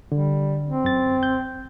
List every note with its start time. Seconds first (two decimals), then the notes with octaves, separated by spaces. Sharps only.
0.12 D3 G3
0.67 C4
0.84 F#2 A6
1.23 G6